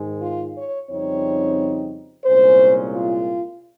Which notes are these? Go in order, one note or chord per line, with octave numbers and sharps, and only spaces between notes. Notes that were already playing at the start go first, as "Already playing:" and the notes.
Already playing: G#2 D#3 G#3
F4
C#5
F2 C#3 G3 C4 D#4 C#5
C2 A#2 G#3 C#4 C5
F4